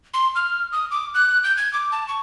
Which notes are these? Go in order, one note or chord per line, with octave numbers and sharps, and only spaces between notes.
C6
F6
D#6
D6
F#6
G6
G#6
D6
A5
C#6